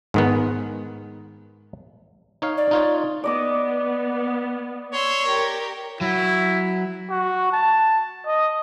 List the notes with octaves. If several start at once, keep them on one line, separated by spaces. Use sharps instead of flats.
G#2 D#3 B3
D#4 C#5 F5
D5
D#4 F4 C#5
B3 D5 D#5 D6
C#5 C6 E6
G4 A#4
F#3 E4
F#4
A5
D#5